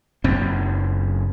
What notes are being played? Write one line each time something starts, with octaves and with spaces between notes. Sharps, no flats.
F#1 F#2 C4